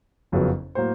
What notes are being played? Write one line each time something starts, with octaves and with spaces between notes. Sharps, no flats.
F#1 F2 C#3 F#3 B3
A2 F#3 A#3 C5